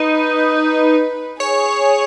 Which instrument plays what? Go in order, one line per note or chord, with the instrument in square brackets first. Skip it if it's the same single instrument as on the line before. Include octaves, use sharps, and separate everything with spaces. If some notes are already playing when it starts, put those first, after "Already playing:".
Already playing: [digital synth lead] D#4 [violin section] B4
[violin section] G#4 [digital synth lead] C#5